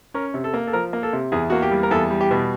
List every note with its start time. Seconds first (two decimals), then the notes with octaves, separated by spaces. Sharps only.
0.14 C#4 A#4
0.34 C3
0.44 A4
0.54 A#3
0.67 A4
0.73 F3 A#4
0.93 A#3
1.03 A4
1.13 C3
1.32 E2 G#4
1.50 A#3 F#4
1.62 G4
1.71 G3
1.83 A#4
1.91 E2 A4
2.10 G3
2.21 G4
2.31 B2